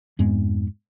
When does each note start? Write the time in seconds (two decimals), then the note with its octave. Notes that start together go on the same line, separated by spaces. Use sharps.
0.19 F2 G#2 G#3 B3